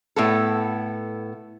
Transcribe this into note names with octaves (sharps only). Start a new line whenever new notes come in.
A2 B3 A4